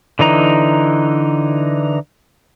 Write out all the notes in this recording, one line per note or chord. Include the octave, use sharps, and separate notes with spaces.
D3 E3 D#4 A#5